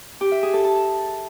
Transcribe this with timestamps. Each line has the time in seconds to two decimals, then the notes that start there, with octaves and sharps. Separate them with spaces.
0.21 G4
0.32 E5
0.43 G#4
0.53 A4
0.64 A5